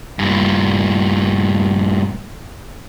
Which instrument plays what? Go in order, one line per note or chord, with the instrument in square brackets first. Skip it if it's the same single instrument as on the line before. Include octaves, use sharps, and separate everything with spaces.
[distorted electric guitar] G2 A#2